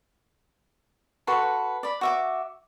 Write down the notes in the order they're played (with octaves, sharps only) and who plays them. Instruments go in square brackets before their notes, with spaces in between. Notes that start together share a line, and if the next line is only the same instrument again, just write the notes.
[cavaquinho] F#4 A4 B4 C6
D5 B5
F#4 E5 D6